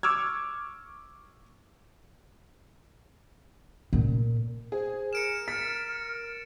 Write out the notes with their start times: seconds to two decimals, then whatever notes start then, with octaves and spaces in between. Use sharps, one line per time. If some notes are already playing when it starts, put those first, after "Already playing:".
0.03 C#6 D6 E6 F6 G#6
3.93 A#2
4.72 G#4 C5
5.13 A#4 F6 C#7 D7 E7
5.48 A6 B6